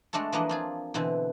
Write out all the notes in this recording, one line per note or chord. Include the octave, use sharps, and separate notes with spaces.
G#3 A3 D4 F#4 A4
E3 F3 A#3 D4 B4 D#5
C4 F4 G#4
B2 D3 E3 C4